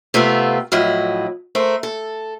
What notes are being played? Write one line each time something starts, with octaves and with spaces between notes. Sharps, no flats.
C3 A3 B3 F4
A2 F3 F#3 E4 D#5
A3 A#4 C5
A4